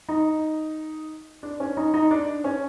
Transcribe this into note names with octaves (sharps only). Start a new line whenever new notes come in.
D#4
D4
C#4
D#4
D#4
D4
C#4